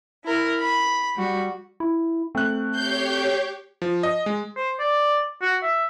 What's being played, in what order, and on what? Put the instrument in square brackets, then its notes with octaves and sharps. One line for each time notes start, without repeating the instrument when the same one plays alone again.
[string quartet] E4 A#4
B5
G3 F#4
[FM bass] E4
[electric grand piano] A3 F#6 [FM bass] C4
[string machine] G4 C#5 [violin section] G6 C7
[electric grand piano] F3
D#5
G#3
[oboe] C5
D5
F#4
E5